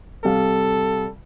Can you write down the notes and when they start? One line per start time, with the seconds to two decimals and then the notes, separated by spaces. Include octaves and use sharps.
0.24 C3 G3 A4 F5